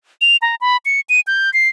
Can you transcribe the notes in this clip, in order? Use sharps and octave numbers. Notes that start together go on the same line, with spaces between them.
F7
A#5
B5
C#7
D#7
G6
C7